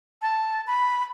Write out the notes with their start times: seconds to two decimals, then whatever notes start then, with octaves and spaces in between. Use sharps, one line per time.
0.22 A5
0.67 B5